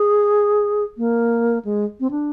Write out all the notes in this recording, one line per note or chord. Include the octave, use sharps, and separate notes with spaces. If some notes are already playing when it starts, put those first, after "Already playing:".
Already playing: G#4
A#3
G#3
C4
D4